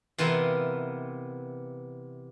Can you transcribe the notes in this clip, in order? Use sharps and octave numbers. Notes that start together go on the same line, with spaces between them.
C3 E3 B3 F4 A#4